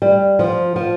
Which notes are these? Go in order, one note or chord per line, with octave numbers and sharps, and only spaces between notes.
G3
F3
F3